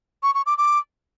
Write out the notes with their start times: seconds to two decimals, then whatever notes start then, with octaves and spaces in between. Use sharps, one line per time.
0.23 C#6
0.35 C#6
0.46 D6
0.58 D6